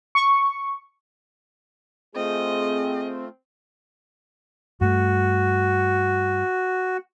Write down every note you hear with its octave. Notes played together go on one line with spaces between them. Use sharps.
C#6
A3 C4 F4 G#4 D#5
G2 A3 F#4